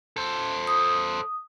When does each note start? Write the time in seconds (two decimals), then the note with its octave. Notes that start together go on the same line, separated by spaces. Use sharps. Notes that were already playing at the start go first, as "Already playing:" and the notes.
0.17 A4 C5
0.67 D#6